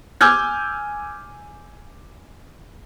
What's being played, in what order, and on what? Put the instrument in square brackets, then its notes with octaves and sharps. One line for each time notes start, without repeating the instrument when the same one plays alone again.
[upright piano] G#5 D6 E6 F6 G6 G#6